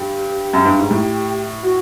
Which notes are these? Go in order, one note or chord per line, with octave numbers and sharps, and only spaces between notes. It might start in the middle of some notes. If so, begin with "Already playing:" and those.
Already playing: G2 G4
F#2
G2
G#2
A2
F#4